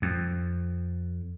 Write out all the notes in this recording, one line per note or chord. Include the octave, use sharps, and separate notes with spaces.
F2